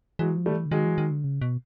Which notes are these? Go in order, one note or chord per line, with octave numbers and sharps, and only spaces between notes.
E3 F#3 G#3
F3
G3 A3
D#3
E3
D3
D#3 F#3 G#3
E3
D#3
D3
C#3
B2